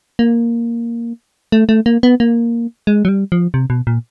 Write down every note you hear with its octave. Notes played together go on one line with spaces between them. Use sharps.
A#3
A3
A3
A#3
B3
A#3
G#3
F#3
G3
F3
C3
B2
A#2